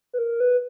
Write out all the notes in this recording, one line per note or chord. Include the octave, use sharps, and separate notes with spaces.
B4
A#4
B4